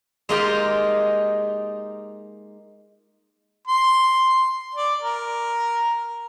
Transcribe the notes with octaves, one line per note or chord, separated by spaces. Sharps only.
G#3 A#3 D#4 F4 G4 G5
C6
D5
A#4